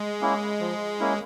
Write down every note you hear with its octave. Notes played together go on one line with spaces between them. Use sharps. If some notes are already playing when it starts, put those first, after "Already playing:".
Already playing: G#3
A#3 C#4 E4
F3
A#3 C#4 E4